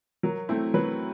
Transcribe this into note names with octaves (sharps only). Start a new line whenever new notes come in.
F#3 A#4
A3 C4 E4
F#3 B4